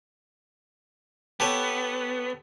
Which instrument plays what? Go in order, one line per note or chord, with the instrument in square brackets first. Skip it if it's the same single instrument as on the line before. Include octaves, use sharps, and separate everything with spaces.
[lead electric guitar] B3 [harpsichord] G4 A4 C#5